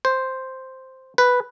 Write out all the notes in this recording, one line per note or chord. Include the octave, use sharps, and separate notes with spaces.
C5
B4